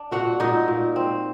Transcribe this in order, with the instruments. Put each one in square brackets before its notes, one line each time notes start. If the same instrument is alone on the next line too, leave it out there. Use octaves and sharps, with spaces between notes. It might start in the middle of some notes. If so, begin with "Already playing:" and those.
Already playing: [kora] D4
A#2 F#4 F#5
A#2 D#4 D#5
A#2
C4